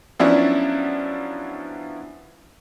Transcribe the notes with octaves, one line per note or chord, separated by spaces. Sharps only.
F3 F#3 B3 C#4 D4 E4